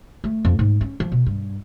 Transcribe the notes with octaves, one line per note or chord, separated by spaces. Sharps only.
A3
F2
G#2
C#4
F3
B2
G2